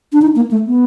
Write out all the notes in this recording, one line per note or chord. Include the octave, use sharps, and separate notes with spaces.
D4
D#4
A#3
A3
B3